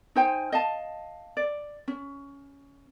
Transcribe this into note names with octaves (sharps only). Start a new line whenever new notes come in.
D#4 C5 G5 G#5
D#5 F5 A5
D5
C#4